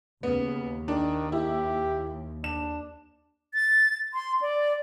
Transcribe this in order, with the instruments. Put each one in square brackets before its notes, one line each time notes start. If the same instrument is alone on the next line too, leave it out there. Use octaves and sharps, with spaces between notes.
[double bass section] D#2 [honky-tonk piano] C#3 B3
[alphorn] D#3 [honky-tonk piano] D4
[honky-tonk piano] E4 [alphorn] G4
[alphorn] D4 [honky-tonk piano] E7
[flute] A6
C6
D5